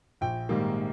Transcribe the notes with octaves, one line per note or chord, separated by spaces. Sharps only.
A#1 G5
G#2 D#3 G3 A#3